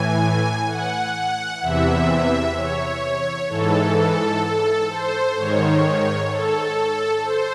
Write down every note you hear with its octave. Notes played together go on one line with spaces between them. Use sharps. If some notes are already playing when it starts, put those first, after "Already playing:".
Already playing: A2 E3 G#5
F#5
E2 C3 E3 E5
C#5
G#2 E3 A4
A4
A4
C5
G#2 D#3 C#5
A4
C5